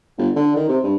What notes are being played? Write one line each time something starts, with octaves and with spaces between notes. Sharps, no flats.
G1
D3
D#3
C3
G2